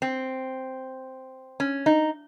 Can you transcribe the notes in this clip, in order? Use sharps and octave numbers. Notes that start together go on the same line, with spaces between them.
C4
C#4
D#4